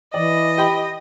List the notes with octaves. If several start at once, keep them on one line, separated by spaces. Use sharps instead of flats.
E3 D5 D#5
G4 G5 B5